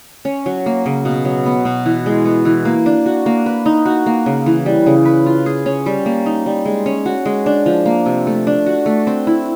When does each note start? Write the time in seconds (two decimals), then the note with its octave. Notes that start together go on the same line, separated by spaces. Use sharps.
0.25 C#4
0.46 F#3
0.66 A#3
0.86 C#3
1.05 B2
1.25 F#3
1.46 B3
1.65 B2
1.86 E3
2.06 G#3
2.25 B3
2.45 E3
2.65 A#3
2.86 D4
3.06 F#4
3.26 A#3
3.46 B4
3.66 D#4
3.86 F#4
4.06 A#3
4.26 C#3
4.46 E3
4.66 G3
4.86 C#3
5.05 B4
5.26 F4
5.46 G#4
5.66 C#4
5.86 G3
6.06 A#3
6.26 D#4
6.46 G3
6.65 G#3
6.86 C#4
7.06 F#4
7.26 G#3
7.46 D4
7.66 F3
7.86 A#3
8.06 C3
8.27 A3
8.47 D4
8.66 F#4
8.86 A3
9.07 C4
9.27 E4